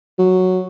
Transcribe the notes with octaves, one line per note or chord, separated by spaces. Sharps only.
F#3